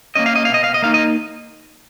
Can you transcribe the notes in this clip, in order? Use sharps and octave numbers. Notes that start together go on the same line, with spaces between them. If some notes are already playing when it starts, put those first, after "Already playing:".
A#3 C#4 D#5
F5
D#5
F5
B2
D#5
F5
D#5
A#3 D#4 F5
D#5